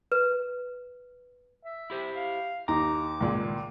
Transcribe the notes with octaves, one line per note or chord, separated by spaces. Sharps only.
B4
E5
E4 G4 C5
F5
D#2 D#4 A#5 D6
C#2 A#2 D#3 G#3